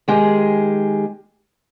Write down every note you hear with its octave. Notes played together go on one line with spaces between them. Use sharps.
D#3 G#3 G4 G#4